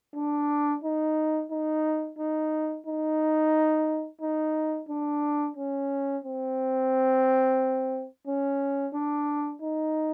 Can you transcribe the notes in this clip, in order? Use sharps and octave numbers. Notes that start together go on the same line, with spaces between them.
D4
D#4
D#4
D#4
D#4
D#4
D4
C#4
C4
C#4
D4
D#4